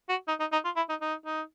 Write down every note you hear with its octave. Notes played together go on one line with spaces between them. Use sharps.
F#4
D#4
D#4
D#4
F4
E4
D#4
D#4
D#4